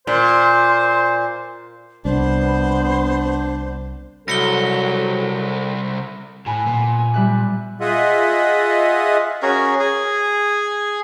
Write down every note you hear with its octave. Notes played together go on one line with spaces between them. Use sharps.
A#2 C5
C2 B3 D4 C5
C2 F#3 A4 A#6 C#7 G7
A2 G#5 B5 F#6
A#2 B3
G#5
G3 E5 F#6
F4 G#4 D#5 E5 F#5
C#4 F#4 G#4 A#4
G#4